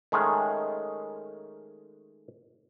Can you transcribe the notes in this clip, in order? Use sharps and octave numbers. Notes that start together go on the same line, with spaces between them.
D#3 G#3 A3 C#4 G#4